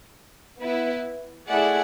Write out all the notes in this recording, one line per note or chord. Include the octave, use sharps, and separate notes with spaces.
B3 E4 B4
A3 E4 G#4 D5 F#5